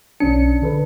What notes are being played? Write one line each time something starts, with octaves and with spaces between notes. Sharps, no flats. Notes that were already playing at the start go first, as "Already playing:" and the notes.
B1 C#4 D4 C#7
D3 A4 B4